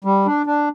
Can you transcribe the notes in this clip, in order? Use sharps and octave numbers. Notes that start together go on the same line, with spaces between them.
G3
D4
D4